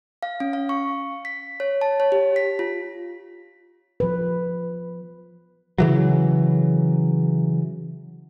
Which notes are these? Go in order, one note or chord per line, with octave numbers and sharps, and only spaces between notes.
F5
C#4
F5
C#6
B6
C#5
A5
C#5
G4
B6
F4
F3 B4
C#3 E3 F#3